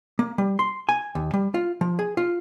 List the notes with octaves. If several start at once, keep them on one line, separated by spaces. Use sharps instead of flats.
A#3
G3
C6
G#5
D#2
G3
F4
F3
G#4
F4